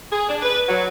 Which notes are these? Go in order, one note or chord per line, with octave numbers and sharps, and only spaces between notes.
G#4
D4
B4
F#3